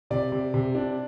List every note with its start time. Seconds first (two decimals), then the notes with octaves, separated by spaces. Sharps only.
0.11 C3 D5
0.32 C3
0.54 C3
0.75 D4